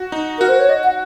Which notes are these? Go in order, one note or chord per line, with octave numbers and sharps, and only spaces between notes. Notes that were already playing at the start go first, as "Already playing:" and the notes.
Already playing: F#4
D#4
F#4 A#4
C5
C#5
D#5
F#5